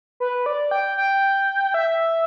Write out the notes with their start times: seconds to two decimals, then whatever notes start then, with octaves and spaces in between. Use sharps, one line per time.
0.20 B4
0.46 D5
0.71 G5
0.97 G5
1.74 E5